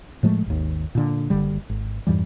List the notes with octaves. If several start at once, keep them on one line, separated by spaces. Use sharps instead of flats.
A2 F3 G#3 A3
G#1 D#2
A#2 D3
F#1 D3 G3
G#1
F2 G#2 E3 G3